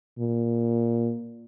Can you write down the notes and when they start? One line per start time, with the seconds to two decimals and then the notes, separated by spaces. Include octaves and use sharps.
0.19 A#2